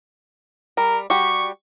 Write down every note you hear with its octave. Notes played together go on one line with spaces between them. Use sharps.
G3 A#4
G3 F#4 G4 C#6